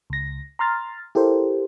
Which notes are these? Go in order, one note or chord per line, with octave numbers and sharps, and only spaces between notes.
C#2 A#6
A#5 C6 F6 A6
E4 G4 A4 A#4 C5